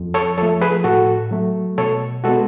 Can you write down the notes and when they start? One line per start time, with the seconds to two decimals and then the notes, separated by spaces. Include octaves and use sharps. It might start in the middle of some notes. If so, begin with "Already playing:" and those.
Already playing: F2
0.14 A4 C#5
0.38 F3 A4 C#5
0.43 A3
0.61 G#4 B4
0.84 A2 F#4 A4
1.31 F#3 A3
1.78 B2 A4 C#5
2.24 G#3 B3 F#4 A4